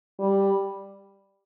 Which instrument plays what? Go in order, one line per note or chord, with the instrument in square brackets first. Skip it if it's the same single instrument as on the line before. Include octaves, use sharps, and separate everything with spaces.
[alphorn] G3